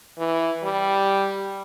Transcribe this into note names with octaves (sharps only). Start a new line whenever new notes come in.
E3
G3